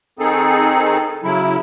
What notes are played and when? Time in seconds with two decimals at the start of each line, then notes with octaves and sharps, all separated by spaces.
0.19 D#3 C4 D#4 G#4 A4
1.24 C#3 F#3 E4